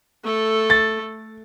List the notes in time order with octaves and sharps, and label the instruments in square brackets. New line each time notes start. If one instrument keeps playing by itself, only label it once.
[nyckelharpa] A3 A4
[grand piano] A6